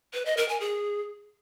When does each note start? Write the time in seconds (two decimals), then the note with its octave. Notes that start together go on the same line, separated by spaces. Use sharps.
0.14 B4
0.26 D#5
0.37 A#4
0.49 G#5
0.60 G#4